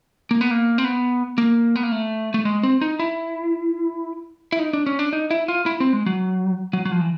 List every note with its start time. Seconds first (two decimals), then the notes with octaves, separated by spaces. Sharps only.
0.31 A#3
0.41 B3
0.51 A#3
0.78 C4
0.85 B3
1.38 A#3
1.76 B3
1.83 A#3
1.92 A3
2.34 A3
2.45 G#3
2.63 C4
2.81 D#4
2.99 E4
4.52 E4
4.59 D#4
4.73 D4
4.86 C#4
4.99 D4
5.13 D#4
5.31 E4
5.48 F4
5.66 E4
5.80 C4
5.93 G#3
6.06 F#3
6.73 F#3
6.85 F#3
6.92 F3
7.01 E3